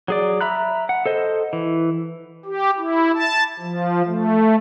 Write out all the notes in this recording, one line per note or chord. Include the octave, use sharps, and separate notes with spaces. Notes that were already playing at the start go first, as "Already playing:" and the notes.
F#3 G#4 D5
E5 A#5 B5 F#6
F#5
A4 C5 D#5
E3
G4
E4
A5
F3
A3